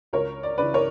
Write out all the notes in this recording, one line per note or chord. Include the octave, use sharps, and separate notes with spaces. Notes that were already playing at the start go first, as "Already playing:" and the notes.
C#2 A#4 C#5
D5
C#3 E3 B4 D5
A#4 C#5